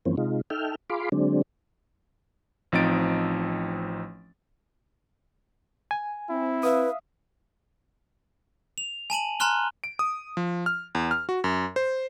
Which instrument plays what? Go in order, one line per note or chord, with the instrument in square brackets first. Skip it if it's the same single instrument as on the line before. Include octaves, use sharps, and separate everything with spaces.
[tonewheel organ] G2 E3 F3 A#3 C4 C#4
C3 G#3 D#4 F4
D#4 A4 E5 G5 F6
F4 G#4 F5 B5 C6 D6
D3 F#3 G#3 C4 D4
[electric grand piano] A1 F3 C4 D#4 A6 D7
[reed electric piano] G#5
[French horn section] C4 [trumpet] E4
[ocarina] B4 [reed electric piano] E5 F5 D#6
[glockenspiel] F7
G#5 A5 D#7 F#7
G#5 A#5 C6 F6 F#6 G7
[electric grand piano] D7
D#6
F3
F6
E2
F6
F#4
F#2
C5